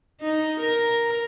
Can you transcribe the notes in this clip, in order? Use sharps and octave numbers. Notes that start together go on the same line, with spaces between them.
D#4
A#4